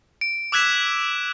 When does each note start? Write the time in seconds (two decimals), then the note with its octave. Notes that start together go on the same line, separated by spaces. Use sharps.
0.21 D7
0.52 D6 E6 F#6 G#6 B6 E7